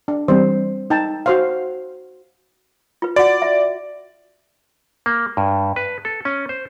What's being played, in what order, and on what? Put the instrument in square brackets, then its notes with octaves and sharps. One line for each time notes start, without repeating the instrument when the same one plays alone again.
[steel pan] D4
[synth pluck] E3 G3 C4 [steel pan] C5
[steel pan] D#4 G5 A5
F#4 C5 F5
[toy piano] F4 B4
[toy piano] F#4 F#5 [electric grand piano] D5
[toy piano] E5
[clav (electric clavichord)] A#3
G2
B4
A4
C#4
C5